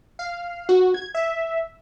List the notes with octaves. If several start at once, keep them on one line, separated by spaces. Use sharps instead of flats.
F5
F#4
G#6
E5